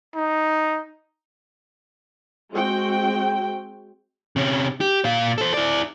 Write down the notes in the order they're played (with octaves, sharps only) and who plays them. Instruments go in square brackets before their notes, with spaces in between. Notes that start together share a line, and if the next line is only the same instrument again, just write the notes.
[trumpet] D#4
[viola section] G#3 C4 F#4 G5
[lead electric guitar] C3 C#4
G4
A#2 F5
A4 C5
E4 D5